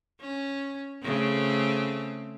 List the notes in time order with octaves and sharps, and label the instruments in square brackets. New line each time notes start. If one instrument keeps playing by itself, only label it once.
[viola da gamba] C#4
C#3 A3 C4